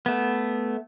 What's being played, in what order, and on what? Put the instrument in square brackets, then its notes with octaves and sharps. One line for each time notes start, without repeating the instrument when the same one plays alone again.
[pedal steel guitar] A3 B3